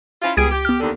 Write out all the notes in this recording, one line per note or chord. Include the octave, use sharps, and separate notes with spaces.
C#4 E4 F4
C#2 G3 B3 G#4 G#6 D7
G4
B3 F6
D#2 D3